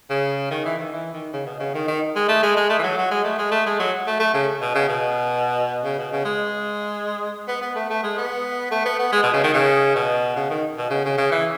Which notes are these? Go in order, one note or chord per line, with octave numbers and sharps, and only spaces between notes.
C#3
D#3
E3
D#3
E3
D#3
C#3
B2
C#3
D#3
D#3
G#3
A3
G#3
G#3
A3
E3
F#3
F#3
G#3
A3
G#3
A3
G#3
F#3
A3
A3
C#3
B2
C#3
B2
C#3
B2
C#3
G#3
B3
B3
A3
A3
G#3
B3
A3
B3
B3
G#3
B2
C#3
D#3
C#3
B2
C#3
D#3
B2
C#3
C#3
C#3
E3